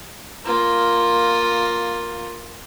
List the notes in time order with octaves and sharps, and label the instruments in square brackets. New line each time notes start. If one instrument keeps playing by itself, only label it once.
[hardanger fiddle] A#3 F4